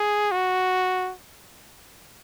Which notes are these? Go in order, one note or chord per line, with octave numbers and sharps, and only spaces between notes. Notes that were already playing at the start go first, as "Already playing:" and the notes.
Already playing: G#4
F#4